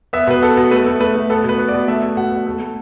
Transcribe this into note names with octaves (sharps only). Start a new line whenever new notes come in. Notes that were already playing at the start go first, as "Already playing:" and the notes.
B3 E5
B2 B4
B3 A4
B2
A3 B4
A3
A3 B4
A3
B3 A4
B2 B4
B3
D5
B2
A3 E5
A3
B2 F#5
B2
A3
A3